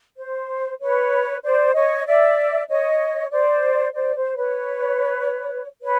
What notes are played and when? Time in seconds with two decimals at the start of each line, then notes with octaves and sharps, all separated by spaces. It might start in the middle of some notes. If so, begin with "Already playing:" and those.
0.18 C5
0.80 B4 C#5
1.43 C5 D5
1.75 C#5 D#5
2.06 D5 E5
2.69 C#5 D#5
3.32 C5 D5
3.94 C5 D5
4.15 C5
4.36 B4 C#5
5.82 B4 C#5